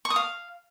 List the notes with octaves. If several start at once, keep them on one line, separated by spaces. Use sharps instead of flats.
C#6
D#6
F5